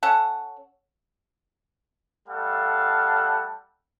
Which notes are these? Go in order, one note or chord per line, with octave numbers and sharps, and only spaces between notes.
C#4 A4 F#5
G3 A3 A4 F5 F#5